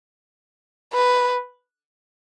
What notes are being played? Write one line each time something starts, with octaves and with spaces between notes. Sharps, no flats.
B4